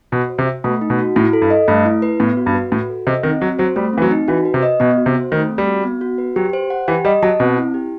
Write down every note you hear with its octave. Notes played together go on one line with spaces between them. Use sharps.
B2 F#4
C5
C3
E5
B2 A3
D#4
B2
F#4
A2 E4
A4
G2
D#5
G2 A3
E4
B4
A2 B3
F#4
G2
B4
A2 F#4
A4
C3 D#5
D#3 C4
F#3 F#4
F#3 C5
G3 A3
E3 C4
F#3
D#4
E3 F#4
B4
C3
D#5
B2 B3
F#4
C3
C5
D#3 A3
C4
G3
F#4
B3
F#4
B4
F#3 G4
C5
F#5
E3 G4
G3 D#5
F#3 A5
B2 C4
E4
G4